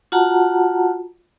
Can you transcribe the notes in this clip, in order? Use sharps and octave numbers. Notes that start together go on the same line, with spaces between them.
F4 F#4 F#5 A5 A#5